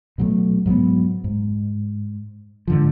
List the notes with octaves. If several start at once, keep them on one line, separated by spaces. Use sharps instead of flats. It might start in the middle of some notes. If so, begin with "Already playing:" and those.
B2 F#3 G#3 A3
G#2 F#3 G3 B3
G#2
G#2 D3 F3